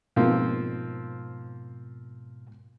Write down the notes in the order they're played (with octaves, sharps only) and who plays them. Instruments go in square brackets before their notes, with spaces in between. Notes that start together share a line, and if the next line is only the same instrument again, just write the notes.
[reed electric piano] G#2 B2 [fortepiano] F3 A#3 C4